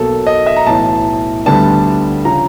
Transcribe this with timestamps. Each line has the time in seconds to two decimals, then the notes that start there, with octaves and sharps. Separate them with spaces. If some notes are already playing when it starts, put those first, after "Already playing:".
Already playing: B1 B2 F#3 A#3 A4
0.27 D#5
0.47 E5
0.56 A#5
0.66 B1 A2 E3 A5
1.46 D2 D3 G3 B3 D4 A5
2.25 C#3 F3 A#5